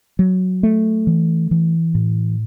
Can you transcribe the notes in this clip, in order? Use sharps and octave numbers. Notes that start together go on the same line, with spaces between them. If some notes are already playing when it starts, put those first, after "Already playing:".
F#3
A3
E3
E3
A2